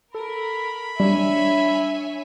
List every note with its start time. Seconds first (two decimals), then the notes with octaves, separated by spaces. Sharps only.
0.15 A4 A#4 B5
1.00 G3 D4 C#5 E5 G#5